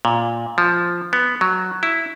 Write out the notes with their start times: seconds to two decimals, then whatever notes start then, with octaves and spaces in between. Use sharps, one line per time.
0.05 A#2
0.58 F3
1.13 B3
1.41 F#3
1.83 E4